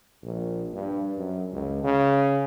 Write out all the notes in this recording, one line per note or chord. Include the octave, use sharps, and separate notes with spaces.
A#1
G2
F#2
C#2
C#3